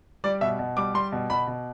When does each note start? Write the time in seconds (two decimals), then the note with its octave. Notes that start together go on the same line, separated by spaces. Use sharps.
0.24 G3 D5
0.41 B2 E5
0.59 B2
0.77 G3 D6
0.94 G3 C6
1.12 B2
1.30 B2 B5
1.47 B2